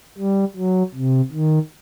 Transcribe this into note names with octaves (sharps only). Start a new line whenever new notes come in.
G3
F#3
C3
D#3